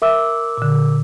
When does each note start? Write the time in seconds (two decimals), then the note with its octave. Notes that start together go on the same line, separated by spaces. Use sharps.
0.02 A#4 E5 D6 E6
0.57 A#2 D3